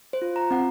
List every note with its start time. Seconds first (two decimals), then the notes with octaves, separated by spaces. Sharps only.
0.13 C5
0.22 F4
0.36 A#5
0.51 C4 F#5